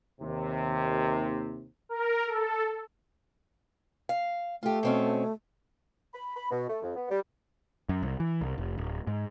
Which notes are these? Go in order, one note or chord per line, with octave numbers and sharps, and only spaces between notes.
D#2 C3
A#4
A4
F5
A3 F4 G4
B2 C4 C#4
B5
B5
B2
A3
F2
B3
G3
F#2
C2
E3
C2
F1
D1
G#2